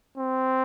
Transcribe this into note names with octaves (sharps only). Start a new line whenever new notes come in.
C4